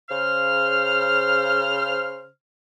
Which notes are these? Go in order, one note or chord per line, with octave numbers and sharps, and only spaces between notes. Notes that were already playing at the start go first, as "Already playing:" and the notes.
C#3 C5 F6